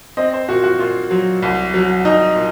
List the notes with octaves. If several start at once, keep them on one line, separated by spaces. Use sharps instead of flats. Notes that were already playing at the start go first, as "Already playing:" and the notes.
C4 D#5
C5
A#2 F#4
F#4
A#2 F4
F#3
C2
F#3
C2 D#4
A#2